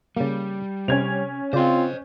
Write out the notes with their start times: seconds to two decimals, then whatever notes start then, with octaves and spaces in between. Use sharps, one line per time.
0.17 C#3 G3 A#3
0.88 C3 C#4 G#6 F7
1.53 C#3 C4 F4 C5 D5 D#5